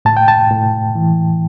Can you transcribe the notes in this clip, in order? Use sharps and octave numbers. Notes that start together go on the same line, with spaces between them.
A2 A5
G5
A5
A2
E3